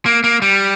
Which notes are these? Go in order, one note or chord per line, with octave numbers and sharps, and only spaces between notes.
A#3
A#3
G3